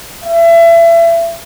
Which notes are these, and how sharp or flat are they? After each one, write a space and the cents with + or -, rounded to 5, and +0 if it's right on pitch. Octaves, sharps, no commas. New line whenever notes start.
E5 +30